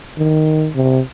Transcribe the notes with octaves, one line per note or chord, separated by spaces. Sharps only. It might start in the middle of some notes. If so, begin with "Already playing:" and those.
D#3
C3